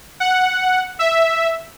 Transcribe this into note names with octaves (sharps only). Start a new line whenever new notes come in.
F#5
E5